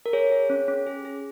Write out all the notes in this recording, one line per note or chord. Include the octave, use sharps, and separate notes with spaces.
A#4
G#4 C#5
G#4
C#4
C#4
G#4
G#4